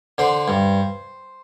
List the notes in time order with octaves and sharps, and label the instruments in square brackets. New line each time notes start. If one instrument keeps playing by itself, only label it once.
[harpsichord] D3 C5
G2